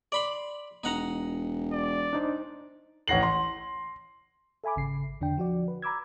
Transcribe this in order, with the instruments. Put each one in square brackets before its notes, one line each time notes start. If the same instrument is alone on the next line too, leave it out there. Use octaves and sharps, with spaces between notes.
[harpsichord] D5 B5 C6
[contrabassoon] E1 [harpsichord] D#4 F#5 A#5
[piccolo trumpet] D5
[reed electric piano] D4 D#4 C5
[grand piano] A1 C#5 F#5 A#6 C7 F#7
C6
[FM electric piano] A4 E5 G#5 B5 D6
G#1 C#3 C7
E2 D3 D4 G5
F3 F#4 D5
B4
A#5 B5 D6 E6 G#6